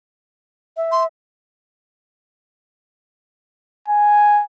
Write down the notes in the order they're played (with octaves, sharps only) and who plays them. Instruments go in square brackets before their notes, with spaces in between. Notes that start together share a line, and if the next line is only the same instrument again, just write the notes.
[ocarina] E5
[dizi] C6
[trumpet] G#5